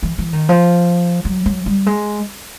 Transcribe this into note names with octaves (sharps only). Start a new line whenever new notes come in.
E3
E3
D#3
F3
F#3
F#3
G3
G#3